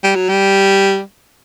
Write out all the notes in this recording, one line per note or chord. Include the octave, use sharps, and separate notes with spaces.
G3
F#3
G3